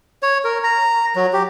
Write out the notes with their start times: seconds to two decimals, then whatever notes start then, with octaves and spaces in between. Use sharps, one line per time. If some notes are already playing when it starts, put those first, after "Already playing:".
0.23 C#5
0.44 A#4
0.64 A#5
1.16 F#3
1.33 G4